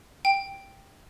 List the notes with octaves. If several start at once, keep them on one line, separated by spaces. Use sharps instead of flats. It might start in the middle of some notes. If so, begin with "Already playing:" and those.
G5